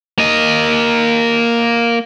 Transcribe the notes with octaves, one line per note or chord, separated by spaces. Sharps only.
A#3 D#5